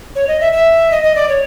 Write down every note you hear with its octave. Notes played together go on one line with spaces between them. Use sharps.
C#5
D#5
E5
E5
D#5
D#5
D5
C#5